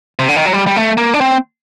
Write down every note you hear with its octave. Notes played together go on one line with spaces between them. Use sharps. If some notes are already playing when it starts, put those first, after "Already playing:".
C3
D3
D#3
F#3
G3
G3
A3
A#3
D4
C4